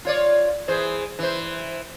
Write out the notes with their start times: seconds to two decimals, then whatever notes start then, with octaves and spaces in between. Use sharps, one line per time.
0.05 F4 C#5 D5
0.68 E3 G#4 C5
1.19 E3 C5